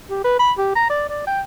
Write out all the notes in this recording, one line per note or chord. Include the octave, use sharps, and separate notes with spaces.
G4
B4
B5
G4
A#5
D5
D5
G5